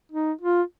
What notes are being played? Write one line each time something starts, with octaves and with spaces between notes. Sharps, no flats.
D#4
F4